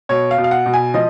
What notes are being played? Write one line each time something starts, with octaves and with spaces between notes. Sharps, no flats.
B2 C#5
F5
B2
F5
F#5
B2
G#5
F3 D#5